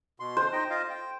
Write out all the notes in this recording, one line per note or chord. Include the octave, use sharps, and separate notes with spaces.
B2 C6
C5
D#4 D#5 G5
F4 D#5 F5
G5